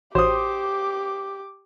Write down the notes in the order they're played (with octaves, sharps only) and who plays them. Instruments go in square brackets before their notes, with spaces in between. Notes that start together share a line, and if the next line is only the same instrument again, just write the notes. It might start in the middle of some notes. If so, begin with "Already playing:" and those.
[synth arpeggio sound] A1 F#4 C#5 [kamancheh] G4 D6 [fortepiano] C5 D#6